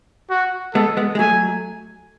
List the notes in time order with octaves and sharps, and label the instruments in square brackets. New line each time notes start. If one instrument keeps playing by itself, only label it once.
[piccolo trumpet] F#4
[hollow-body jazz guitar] G#3 B3 [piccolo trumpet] A4
[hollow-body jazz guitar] G#3 B3
G#3
[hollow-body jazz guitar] F#3 A3 [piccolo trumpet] G#5